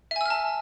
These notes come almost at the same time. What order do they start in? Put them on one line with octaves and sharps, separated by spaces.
E5 G#5 E6 F6 A5